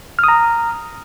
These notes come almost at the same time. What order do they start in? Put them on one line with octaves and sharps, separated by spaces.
F6 D#6 A#5